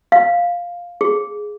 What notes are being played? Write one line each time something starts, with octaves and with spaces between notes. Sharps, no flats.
F5
G#4